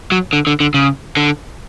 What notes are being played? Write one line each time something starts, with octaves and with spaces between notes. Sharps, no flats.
F#3
D3
D3
D3
C#3
D3